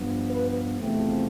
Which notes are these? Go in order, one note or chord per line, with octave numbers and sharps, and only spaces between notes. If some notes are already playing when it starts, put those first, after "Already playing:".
Already playing: G2 F3 B3
B4
E2 C3 F3 A3 C4